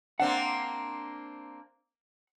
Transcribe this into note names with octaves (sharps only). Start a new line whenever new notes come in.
A#3 C4 D4 F#5